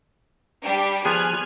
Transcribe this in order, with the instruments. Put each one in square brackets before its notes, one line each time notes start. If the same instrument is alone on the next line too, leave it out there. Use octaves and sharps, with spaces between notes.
[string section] G3 D4 G4
[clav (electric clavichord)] F3 B3 G#4 [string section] G#5 F6 F#6